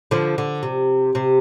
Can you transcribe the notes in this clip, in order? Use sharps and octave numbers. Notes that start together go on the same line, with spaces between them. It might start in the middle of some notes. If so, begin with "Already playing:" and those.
D3 F3
D3
C3
C3